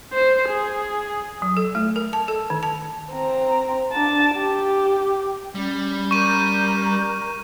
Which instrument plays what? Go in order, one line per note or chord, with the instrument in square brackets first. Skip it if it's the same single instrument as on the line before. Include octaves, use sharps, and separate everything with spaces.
[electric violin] C5
G#4
[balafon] F#3
A4
A3
A#4
A5
A4
D#3
A5
[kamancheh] C4 A#5
D4 A5
G4
[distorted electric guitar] G3 [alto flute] C#4
[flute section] A#4 A#5 G6 [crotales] C#6 D#7